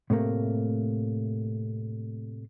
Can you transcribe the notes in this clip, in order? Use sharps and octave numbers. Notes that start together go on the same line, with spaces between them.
A2 C3 A3 A#3